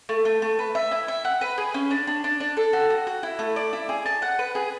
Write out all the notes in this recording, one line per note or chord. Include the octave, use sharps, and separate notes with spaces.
A3
A3
A3
B4
E5
E4
E5
F#5
B4
G#4
C#4
D4
D4
D4
D4
A4
F#4
F#4
F#4
E4
A3
D5
E4
G#4
A5
F#5
B4
G#4